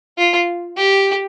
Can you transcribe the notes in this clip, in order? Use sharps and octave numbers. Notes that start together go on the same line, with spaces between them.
F4
G4